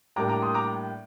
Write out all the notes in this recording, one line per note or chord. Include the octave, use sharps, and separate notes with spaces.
A2 G3 A#3 D4 A#5 D6
A#5 D6
C6 D#6
A#5 D6